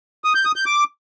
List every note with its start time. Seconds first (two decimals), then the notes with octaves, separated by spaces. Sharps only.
0.24 D#6
0.35 G6
0.45 D#6
0.56 G6
0.66 D6